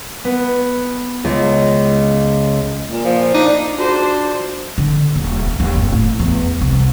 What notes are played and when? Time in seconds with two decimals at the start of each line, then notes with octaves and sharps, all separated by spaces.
0.25 B3
1.24 C#2
2.88 A#2
3.05 F3
3.34 D4 D#4
3.78 D4 F4 F#4 G#4 C5
4.78 D3
5.16 D#1
5.47 G2
5.60 D#2
5.76 G1
5.92 A2
6.19 E2
6.61 C2